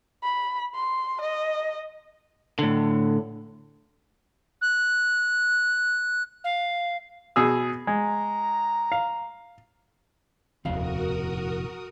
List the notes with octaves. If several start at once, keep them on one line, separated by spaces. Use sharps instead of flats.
B5
C6
D#5
A2 D3
F#6
F5
B2 G#4 E6
G#3 A#5
F5
D#1 C2 F2 B2 F#4 A#4 F5 D#6